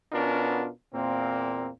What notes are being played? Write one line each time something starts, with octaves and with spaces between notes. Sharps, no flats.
B2 B3 C#4 D4 F4 A#4
E2 A#2 A#3 C4